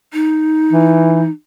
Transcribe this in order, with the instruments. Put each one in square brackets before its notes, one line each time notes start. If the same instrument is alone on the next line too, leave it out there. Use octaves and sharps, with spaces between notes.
[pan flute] D#4
[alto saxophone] E3